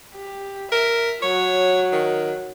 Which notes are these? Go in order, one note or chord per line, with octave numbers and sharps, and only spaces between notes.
G4
A#4 E5
F#3 C#5
D#3